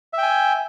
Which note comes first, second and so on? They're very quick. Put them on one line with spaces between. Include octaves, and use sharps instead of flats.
E5 G5 G#5